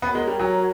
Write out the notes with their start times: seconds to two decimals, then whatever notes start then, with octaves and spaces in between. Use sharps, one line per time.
0.02 B3 F#4 A#4 C#5
0.15 G#3
0.27 G3
0.39 F#3